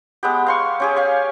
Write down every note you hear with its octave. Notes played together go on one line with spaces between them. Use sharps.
G#3 B3 G4
F5 C6 C#6
C#4 G4 G#4
F5 C#6